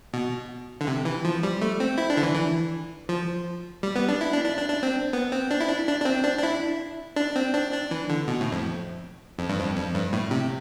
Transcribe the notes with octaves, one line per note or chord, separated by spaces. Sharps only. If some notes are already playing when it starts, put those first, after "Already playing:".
B2
D3
C3
E3
F3
G3
A3
C4
E4
D4
D3
E3
E3
F3
G3
B3
D4
E4
D4
D4
D4
D4
C4
B3
C4
D4
E4
D4
D4
D4
C4
D4
D4
E4
D4
C4
D4
D4
E3
D3
B2
A2
F2
F2
G2
F2
F2
G2
A2
C3